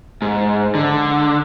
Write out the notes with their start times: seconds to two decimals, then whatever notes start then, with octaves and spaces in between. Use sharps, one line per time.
0.22 G#2
0.75 D3